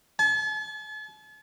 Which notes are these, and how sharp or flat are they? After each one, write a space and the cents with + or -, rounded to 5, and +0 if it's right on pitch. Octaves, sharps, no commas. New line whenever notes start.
A5 -45